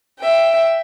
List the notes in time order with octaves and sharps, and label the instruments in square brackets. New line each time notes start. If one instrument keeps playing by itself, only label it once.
[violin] E5 G5